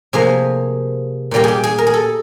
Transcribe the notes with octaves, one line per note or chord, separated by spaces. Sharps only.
C3 F3 A#3 G#4
A#2 G3 A#3 G4
G4 G#4
G#4
A#4
G#4
A4